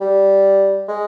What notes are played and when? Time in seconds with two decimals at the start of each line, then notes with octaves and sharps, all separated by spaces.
0.01 G3
0.88 G#3